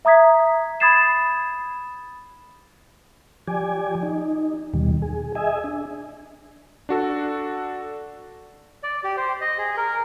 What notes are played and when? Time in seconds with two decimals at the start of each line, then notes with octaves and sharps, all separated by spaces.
0.05 E5 A#5 D#6 G#6 B6
0.80 B5 D#6 G#6 A6 C7 E7
3.47 F3 G4 D5 G#5
4.03 D#4
4.74 D#2 B2 D#3 G3
5.02 G#4
5.35 G#4 D#5 E5 G#5
5.64 D4
6.89 D4 F#4 A4
8.83 D5
9.04 G4
9.17 C5
9.41 D#5
9.58 G#4
9.77 A#4